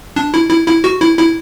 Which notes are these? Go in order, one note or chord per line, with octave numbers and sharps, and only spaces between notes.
D4
E4
E4
E4
F#4
E4
E4